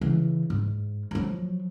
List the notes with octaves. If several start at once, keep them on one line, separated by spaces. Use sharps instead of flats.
C#3 E3
G#2
F3 F#3